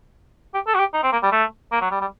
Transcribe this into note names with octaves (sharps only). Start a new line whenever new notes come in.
G4
A4
F#4
G4
D#4
C4
A#3
G3
A3
A#3
F#3
G3
G3